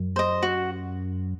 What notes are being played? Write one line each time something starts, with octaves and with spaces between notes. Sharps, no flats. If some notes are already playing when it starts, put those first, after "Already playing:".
Already playing: F#2
C5 D#5
F#4